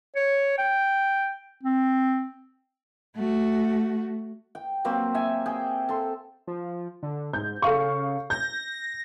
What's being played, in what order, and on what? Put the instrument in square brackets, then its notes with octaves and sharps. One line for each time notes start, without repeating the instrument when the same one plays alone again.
[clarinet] C#5
G5
C4
[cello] A3 F#4
[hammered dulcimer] G5
F#3 A#3 C4 G4
E5 G#5
G#4 G5
A4 C6
[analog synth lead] F3
D3
[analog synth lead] G#2 [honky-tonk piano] G6
[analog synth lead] C#3 [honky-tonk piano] A4 F5 C#6
[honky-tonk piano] G6 [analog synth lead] A#6